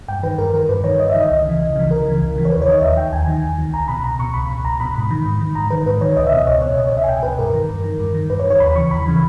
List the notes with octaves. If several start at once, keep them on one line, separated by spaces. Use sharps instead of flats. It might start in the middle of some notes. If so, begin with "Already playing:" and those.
G2 G5
D#3 B4
G2 A#4
D#3 A#4
G2 B4
D#3 C#5
G2 D#5
D#3 E5
D#5
C#2
C#3 E3
C#2
C#3 E3
C#2 A#4
C#3 E3
C#2
C#3 E3
C#5
D#2 B4
C#5
D#3 D#5
D#2 E5
D#3 G5
D#2 G#5
D#3
D#2
D#3
C#2 A#5
B2 B5
C#2 A#5
B2 C#6
C#2 B5
B2
C#2 A#5
B2 B5
G#2 B5
D#3
G#2
D#3
G#2 A#5
D#3 B4
G#2 B4
D#3 C#5
C#2 D#5
E5
B2
D#5
C#2 C#5
B2 C#5
C#2 D#5
B2 C#5
E5
G#5
C#2 G5
B2 B4
G2 A#4
D#3
G2
D#3
G2
D#3
G2 B4
C#5
D#3
C#5
D#2 B5
C#3 E3 C#6
D#2 B5
C#3 E3